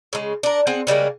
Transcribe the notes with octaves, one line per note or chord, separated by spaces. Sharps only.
C#3 G#3
D4 A#4
C4 G#4 F#5
C#3 G3 G#3 A#3